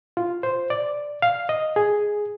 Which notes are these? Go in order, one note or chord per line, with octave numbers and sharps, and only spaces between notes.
F4
C5
D5
F5
D#5
G#4